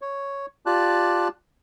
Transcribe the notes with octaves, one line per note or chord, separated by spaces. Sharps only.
C#5
F4 G4 D5 A5 F#6